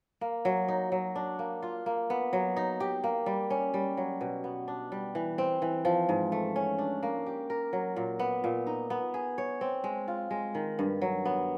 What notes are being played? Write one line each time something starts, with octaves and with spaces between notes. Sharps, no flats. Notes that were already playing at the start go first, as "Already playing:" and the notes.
A#3
F#3
D#4
F#3
D4
A#3
F4
A#3
B3
F#3
D#4
G4
A#3
G3
C#4
G3
F#3
B2
B3
D4
G3
E3
C4
E3
F3
G#2
A3
C#4
D4
A#3
G4
A#4
F#3
A#2
B3
A#2
D#4
B3
G#4
C#5
C4
G#3
F4
G#3
D#3
G2
F#3
B3